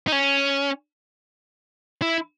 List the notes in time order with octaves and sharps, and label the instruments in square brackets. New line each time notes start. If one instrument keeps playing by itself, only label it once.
[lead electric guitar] D#4
C#4
E4